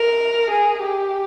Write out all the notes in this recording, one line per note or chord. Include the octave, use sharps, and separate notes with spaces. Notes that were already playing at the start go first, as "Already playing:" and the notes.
Already playing: A#4
G#4
G4